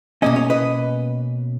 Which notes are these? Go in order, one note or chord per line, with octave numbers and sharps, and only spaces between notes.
B2 A#3 C#4 D#5
C#5
B4 D#5